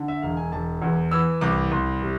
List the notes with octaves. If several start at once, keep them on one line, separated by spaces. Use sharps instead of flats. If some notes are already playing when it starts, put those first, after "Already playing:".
Already playing: D3
E5
E1 F5
G#5
E1 A5
E2
E3 E6
C2 D6
C2 C6
C3